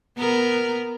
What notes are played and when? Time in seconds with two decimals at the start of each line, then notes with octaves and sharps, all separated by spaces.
0.18 B3 A#4